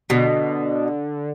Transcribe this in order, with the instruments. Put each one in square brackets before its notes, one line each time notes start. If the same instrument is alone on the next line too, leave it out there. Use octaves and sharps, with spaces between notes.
[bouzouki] B2 [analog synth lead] D3